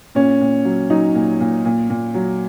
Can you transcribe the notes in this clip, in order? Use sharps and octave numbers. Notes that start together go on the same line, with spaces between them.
A#2 C#4
A#2
F#3
F#3 D#4
A#2
A#2
A#2
A#2
F#3